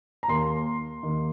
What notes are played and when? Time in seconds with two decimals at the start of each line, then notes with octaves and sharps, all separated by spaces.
0.23 A#5
0.28 D#2 D#3 A#3 C6
1.03 D#2 D#3 A#3